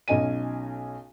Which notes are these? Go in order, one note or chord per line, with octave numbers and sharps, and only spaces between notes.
B1 C#4 D#5 G#5 D#7